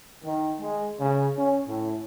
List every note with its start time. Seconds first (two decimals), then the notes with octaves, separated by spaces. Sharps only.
0.23 D#3
0.59 G#3
1.00 C#3
1.37 C#4
1.67 A2